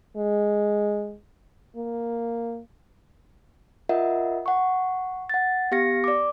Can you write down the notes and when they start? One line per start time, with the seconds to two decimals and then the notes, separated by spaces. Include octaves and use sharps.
0.16 G#3
1.76 A#3
3.89 F4 A#4 D#5 E5 F#5
4.46 F#5 C#6
5.29 F#5 A6
5.71 B3 G4 F5 A#6 C#7
6.04 D5 D6